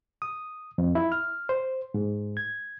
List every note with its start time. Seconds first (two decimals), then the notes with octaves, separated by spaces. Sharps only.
0.22 D#6
0.78 F2
0.95 E4
1.12 F6
1.49 C5
1.94 G#2
2.37 G#6